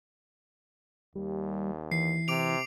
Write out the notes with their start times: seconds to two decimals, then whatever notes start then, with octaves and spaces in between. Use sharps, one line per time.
1.16 D#2 G3
1.92 E3 C7
2.28 C3 D6 D7 F7